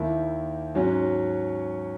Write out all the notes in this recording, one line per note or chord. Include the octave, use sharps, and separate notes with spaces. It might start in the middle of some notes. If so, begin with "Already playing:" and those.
Already playing: D#2 D#3 A#3 E4
G#2 F#3 C#4 F#4